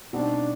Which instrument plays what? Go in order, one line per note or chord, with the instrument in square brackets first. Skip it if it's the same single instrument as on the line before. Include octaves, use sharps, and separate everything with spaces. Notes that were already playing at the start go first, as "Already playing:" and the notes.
[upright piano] B2 G3 C4 D#4 F#4 [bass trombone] D4